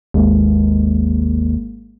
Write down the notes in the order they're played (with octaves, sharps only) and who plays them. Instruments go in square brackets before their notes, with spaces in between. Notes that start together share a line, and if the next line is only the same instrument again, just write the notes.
[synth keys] G#1 G#3 A#3 [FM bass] D#2